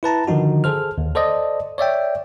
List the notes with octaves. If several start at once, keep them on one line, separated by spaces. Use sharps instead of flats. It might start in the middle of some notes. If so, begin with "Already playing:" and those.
E4 B4 A5 A#5
D3 D#3 F3 D#4 F#4
G#4 A4 C5 F6
D#2
A4 C5 D5 D#5
C#5 D5 E5 G5